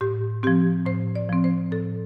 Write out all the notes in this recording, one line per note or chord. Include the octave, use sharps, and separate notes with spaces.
A2 G4
F3 C4 G4
A2 C5
D5
F3 C4
C5
A2 A4